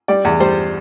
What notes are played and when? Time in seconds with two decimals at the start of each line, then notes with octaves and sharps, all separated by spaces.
0.08 G3 D5
0.25 E2
0.40 G3 C5